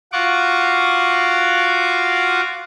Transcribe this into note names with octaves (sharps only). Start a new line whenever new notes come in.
F4 F#4 F#5 C#6 D6